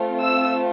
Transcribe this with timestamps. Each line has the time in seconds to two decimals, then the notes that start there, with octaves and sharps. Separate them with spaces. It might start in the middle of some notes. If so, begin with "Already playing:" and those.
Already playing: A3 C4 F4
0.20 E6